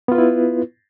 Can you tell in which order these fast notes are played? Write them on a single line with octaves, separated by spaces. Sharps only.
B3 F4 B4 E4